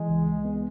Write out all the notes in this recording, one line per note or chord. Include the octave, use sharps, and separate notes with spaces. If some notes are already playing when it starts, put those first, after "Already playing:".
Already playing: E3 G#3
C#2
C#2
B3